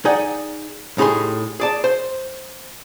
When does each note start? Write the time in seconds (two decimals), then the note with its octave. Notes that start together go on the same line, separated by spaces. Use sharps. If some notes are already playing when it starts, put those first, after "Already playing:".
0.05 D#4 G#4 D5 F#5 G5
0.98 A2 D#4 G4 G#4 B5 C6
1.60 G#4 D5 A5
1.84 C5